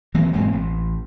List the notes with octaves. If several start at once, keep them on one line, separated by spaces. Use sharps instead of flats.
E3 F#3 A#3 C4
E1 G#2 A#3 C4
A1